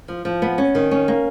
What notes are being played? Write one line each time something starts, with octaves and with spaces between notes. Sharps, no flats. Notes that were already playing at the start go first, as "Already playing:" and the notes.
F3
F3
B3
C#4
D#3
C#4
A#3